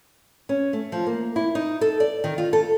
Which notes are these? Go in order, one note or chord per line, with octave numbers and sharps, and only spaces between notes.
C#4
A3
F3
A#3
E4
D#4
A4
D5
D#3
F4
A4